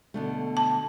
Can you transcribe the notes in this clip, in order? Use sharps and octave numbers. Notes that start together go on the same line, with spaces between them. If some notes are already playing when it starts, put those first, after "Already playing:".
B2 D3 A3
A5